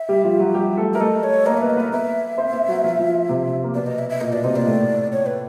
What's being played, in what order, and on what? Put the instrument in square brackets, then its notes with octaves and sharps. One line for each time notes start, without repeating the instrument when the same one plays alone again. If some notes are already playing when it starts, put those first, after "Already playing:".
Already playing: [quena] E5
[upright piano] G3 G4
F3 F4
F#3 F#4
G3 G4
A3 A4
[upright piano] A#4 [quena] E5
[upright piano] A3 A4 [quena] D#5
[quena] C#5
[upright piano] A#3 A#4 [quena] D#5
[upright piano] B3 B4 [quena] E5
[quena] D#5
[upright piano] B3 B4 [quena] E5
[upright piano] B3 B4 [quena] E5
[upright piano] C4 C5
B3 B4
F#3 F#4
F3 F4
F3 F4
C3 C4
A#3
[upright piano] B2 B3 [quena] D5
[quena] D#5
E5
E5
[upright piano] A#2 A#3 [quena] D#5
[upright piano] B2 B3 [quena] D5
[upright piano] C3 C4 [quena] D#5
[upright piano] A#2 A#3 [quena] D5
[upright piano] A2 A3
[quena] C#5
B4